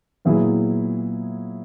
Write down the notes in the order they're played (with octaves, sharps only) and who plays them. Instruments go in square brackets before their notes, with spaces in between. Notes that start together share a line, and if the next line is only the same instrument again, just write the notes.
[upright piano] A#2 F#3 B3 E4 G#4